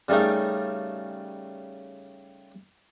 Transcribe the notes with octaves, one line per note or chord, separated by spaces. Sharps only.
C#3 G3 A3 D#4 A#4